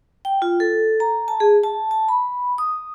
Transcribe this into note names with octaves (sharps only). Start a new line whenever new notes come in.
G5
F4
A4
A#5
A5
G#4
A5
A5
B5
D#6